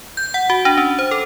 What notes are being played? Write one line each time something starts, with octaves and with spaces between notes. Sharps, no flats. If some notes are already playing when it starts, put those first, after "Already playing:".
G6
F#5
F#4
D4
C#4
C5
A4